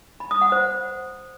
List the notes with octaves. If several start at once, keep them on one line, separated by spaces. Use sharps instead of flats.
B5
D#6
F#5
C5